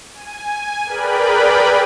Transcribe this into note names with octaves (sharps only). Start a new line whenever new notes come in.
G#5
G#4 A#4 B4 D5 G5 B5